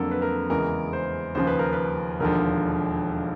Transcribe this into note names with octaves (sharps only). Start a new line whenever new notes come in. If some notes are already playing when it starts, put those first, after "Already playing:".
Already playing: F2 D3 F#3 A#3 A4 A#4
B4
A#4
E2 C#3 E3 G#3 A#4
C5
D#2 C#3 F3 C5
B4
A#4
B4
E1 D#2 D3 F3 A#4